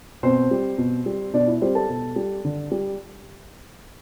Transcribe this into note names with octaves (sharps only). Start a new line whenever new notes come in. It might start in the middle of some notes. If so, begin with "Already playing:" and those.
B2 C4 C5
G3
B2
G3
B2 D4 D5
E4
G3 C4 C5
A4 A5
B2
G3
D3
G3